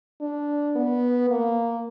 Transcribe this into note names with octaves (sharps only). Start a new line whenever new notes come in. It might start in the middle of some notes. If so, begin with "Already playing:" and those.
D4
B3
A#3